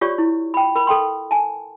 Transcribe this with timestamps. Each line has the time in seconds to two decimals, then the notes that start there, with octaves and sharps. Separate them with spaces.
0.01 F4 G4 C#5 D5 C#6
0.18 E4
0.54 G5 B5
0.75 A#4 B5
0.87 A4 G5 C6
1.31 G#5 A5